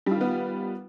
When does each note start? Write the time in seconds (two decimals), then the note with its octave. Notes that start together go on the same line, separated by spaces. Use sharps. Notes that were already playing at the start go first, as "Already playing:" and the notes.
0.06 G3
0.11 F4
0.16 D#3
0.21 B3